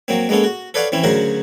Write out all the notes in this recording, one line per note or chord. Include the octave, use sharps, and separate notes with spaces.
F#3 A#3 C4
G#3 A#3 B3 C#4 A4
F#4
A4 B4 C#5 D5 F5 F#5
E3 C4 C#4 E4
D2 C#3 F#3 A#4 C5 F#5